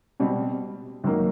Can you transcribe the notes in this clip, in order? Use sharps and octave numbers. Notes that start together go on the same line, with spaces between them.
B2 G3 C4
F#2 D#3 F#3 A#3